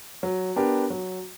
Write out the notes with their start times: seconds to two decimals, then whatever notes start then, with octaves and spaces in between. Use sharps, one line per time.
0.23 F#3
0.56 B3 D4 G4 A#4
0.90 F#3